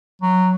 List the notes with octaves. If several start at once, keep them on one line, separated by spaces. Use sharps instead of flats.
F#3